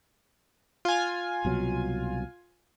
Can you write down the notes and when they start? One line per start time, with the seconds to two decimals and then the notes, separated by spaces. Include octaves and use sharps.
0.85 F4 G#5
1.45 C2 B2 F#3